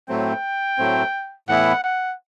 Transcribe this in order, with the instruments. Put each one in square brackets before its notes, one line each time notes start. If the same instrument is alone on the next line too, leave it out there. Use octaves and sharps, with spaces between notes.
[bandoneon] A2 F#3 A3 C4 [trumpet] G5
[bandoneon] A2 F#3 A3 C4
[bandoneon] A2 E3 B3 E4 [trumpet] F#5
[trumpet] F#5